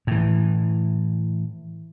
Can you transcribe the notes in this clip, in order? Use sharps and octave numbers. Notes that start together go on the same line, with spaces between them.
A2 E3